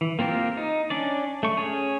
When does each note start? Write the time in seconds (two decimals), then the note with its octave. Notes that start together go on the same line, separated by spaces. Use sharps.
0.01 E3
0.19 A#3 C4 F4 G4 A#4
0.57 D#4
0.90 C#4 D4 D5
1.43 A3 C#6
1.57 C#4 G#4 C#5